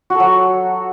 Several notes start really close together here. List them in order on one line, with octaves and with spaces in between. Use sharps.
F#4 A4 F#3